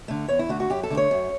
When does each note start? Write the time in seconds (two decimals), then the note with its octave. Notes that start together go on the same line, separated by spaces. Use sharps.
0.08 D3 A3
0.28 E2 C#5
0.39 E4
0.49 D3 A3 F#4
0.60 F#4
0.70 F#2 G4
0.83 A4
0.90 D3 A3
0.97 C#5
1.11 F#2